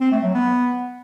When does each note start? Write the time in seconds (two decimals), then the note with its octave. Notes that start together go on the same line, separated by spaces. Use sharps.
0.01 C4
0.12 A3
0.23 F#3
0.34 B3